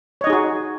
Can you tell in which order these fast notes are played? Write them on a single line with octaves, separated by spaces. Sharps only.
C#5 D#5 D#4 G#4 F#4